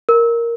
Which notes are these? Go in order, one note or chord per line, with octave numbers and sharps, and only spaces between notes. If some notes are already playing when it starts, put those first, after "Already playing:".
A#4